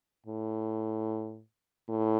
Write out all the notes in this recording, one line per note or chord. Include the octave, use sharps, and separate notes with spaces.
A2
A2